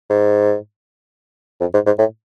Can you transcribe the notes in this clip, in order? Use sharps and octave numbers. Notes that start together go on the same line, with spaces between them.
G#2
F2
G#2
G#2
A2